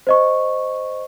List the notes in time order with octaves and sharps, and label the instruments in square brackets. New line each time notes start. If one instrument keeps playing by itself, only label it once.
[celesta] C5 D#5 C#6